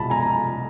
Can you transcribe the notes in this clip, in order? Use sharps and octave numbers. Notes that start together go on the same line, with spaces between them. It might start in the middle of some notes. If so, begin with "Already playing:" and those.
Already playing: C2 B2 G#3 A5 B5
G#5 A#5